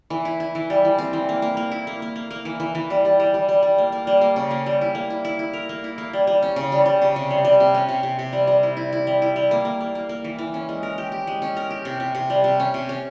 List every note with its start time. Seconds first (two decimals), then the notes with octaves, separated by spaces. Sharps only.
0.10 E3
0.25 E4
0.40 E4
0.55 E3
0.70 G3
0.85 E3
0.98 C4
1.13 E3
1.29 A#3
1.42 A#3
1.57 A#3
1.72 E4
1.87 A#3
2.02 A#3
2.16 A#3
2.30 A#3
2.45 E3
2.60 E3
2.75 E3
2.90 G3
3.05 G3
3.20 G3
3.34 G3
3.49 G3
3.63 G3
3.78 A#3
3.92 A#3
4.07 G3
4.21 A#3
4.36 C#3
4.51 A#3
4.66 G3
4.81 E4
4.95 A#3
5.10 E4
5.25 E4
5.39 E4
5.53 A#4
5.69 A#3
5.84 E4
5.98 A#3
6.13 G3
6.27 G3
6.43 C#4
6.56 C#3
6.72 G3
6.86 G3
7.02 C#3
7.16 C3
7.31 G3
7.45 G3
7.60 C3
7.74 C#4
7.89 C3
8.03 C3
8.19 C3
8.33 G3
8.47 G3
8.63 E4
8.77 E4
8.93 E4
9.07 G3
9.22 E4
9.36 G3
9.51 A#3
9.65 A#3
9.81 A#3
9.95 A#3
10.09 A#3
10.24 E3
10.39 E3
10.54 C#4
10.69 G#3
10.83 A#4
10.98 G4
11.12 G4
11.27 G#3
11.42 C#4
11.57 A#4
11.70 G4
11.85 C3
12.00 C3
12.15 C3
12.30 G3
12.44 C3
12.60 C#4
12.74 C3
12.89 C#4